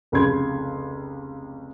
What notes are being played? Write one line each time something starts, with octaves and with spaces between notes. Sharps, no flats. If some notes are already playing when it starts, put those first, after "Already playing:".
F1 C#2 C#3 B5 C6 G#6